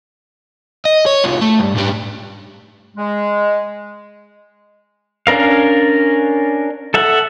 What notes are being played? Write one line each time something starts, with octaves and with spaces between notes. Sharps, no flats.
D#5
C#5
C2 F3
A3
G2
G#2 G3
G#3
C#4 D4 A#4 F5
A4 E5 F#5